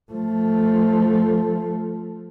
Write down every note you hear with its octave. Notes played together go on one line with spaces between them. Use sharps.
F3 A3